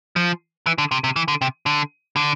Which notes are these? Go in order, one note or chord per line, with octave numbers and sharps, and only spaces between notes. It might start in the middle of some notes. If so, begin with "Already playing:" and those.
F3
E3
D3
C3
C3
E3
D3
C3
D3
D3